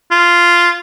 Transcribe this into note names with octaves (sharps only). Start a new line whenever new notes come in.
F4